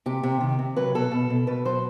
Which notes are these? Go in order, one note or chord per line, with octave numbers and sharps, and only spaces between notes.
C3 G4
C3
D#3
C3
F#3 B4
B2 A4
B2
B2
B2 B4
F#3 C5